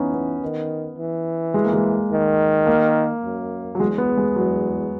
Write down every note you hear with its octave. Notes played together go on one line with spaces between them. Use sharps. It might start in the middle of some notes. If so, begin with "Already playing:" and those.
Already playing: E3 B3 C#4 D#4
B3
D#3
E3
G#3
A#3
G#3
D#3
A#3
F#2
F#3
E2 G#3
B3
G#3
E2 F#3